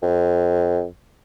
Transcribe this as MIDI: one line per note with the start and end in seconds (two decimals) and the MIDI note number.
0.02 0.86 41